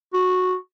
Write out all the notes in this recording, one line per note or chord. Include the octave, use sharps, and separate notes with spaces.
F#4